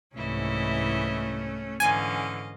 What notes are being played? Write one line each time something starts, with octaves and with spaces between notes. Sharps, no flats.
C2 G#2 E3 A3 C#4 E4 D#5
G#2 D3 E3 C#4 D#5 F5 G#5